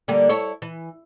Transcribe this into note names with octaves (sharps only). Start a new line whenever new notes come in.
D3 G3 A#3
E4 A4 C#5
E3